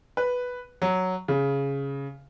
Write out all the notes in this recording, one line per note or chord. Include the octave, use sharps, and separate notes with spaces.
B4
F#3
C#3